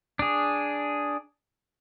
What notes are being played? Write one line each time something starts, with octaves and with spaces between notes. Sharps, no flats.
D4 G#4